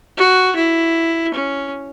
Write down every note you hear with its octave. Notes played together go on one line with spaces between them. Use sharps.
F#4
E4
C#4